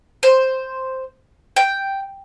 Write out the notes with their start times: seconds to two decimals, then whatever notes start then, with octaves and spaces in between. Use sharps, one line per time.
0.23 C5
1.56 G5